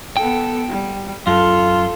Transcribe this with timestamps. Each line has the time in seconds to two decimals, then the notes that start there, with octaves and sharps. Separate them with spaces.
0.17 B3 A4 G5
0.69 G3
1.27 F#2 F4 A4